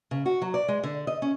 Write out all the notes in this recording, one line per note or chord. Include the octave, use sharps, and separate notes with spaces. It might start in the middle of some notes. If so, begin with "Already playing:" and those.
C#3
F#4
F#3
D5
G#3
D3
D#5
C#4